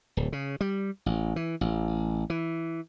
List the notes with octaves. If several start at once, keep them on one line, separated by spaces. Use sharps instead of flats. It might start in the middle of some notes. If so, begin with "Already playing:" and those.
D1
C#3
G3
A1
E3
A1
E3